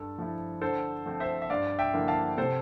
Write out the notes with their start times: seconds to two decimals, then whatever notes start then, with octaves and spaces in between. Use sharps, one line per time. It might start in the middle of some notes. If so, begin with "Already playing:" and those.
Already playing: G2 A4
0.18 F3 A3 E4
0.62 D3 A4 C5
1.06 F3 A3 C4
1.20 C5 E5
1.42 E5
1.49 G2 D5 F5
1.79 E5 G5
1.93 D3 F3 A#3 E4
2.08 F5 A5
2.37 C3 A4 C5